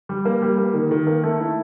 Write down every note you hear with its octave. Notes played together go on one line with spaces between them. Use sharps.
G3
A#3
G3
A#3
D#3
D#3
A#3
A3
E4